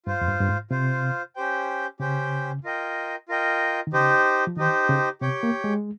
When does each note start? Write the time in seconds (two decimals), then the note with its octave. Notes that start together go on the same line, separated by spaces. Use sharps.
0.06 G2 F4 C5 F5
0.21 F2
0.28 G2
0.41 G2
0.49 G#2
0.71 C3 F4 C5 F5
1.36 C#4 G4 C5 G5
2.00 C#3 C#4 G4 C5 G5
2.64 F4 A#4 D#5 G5
3.29 F4 A#4 D#5 G5
3.87 D#3
3.93 C#3 D#4 G4 C5
4.47 F3
4.57 D#3 D#4 G4 C5
4.89 C#3
5.21 C3 G4 C#5 G5
5.43 A#3
5.64 G#3